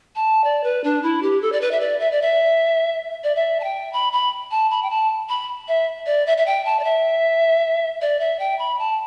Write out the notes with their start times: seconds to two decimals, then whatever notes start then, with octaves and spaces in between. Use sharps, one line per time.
0.16 A5
0.44 D5
0.64 B4
0.84 D4
1.03 E4
1.23 G4
1.42 A4
1.52 D5
1.61 B4
1.71 E5
1.80 D5
1.99 E5
2.11 D5
2.22 E5
3.24 D5
3.36 E5
3.60 A5
3.64 G5
3.93 B5
4.12 B5
4.51 A5
4.71 B5
4.83 G5
4.90 A5
5.29 B5
5.68 E5
6.06 D5
6.26 E5
6.37 E5
6.46 G5
6.65 A5
6.79 D5
6.84 E5
8.02 D5
8.20 E5
8.39 G5
8.59 B5
8.79 A5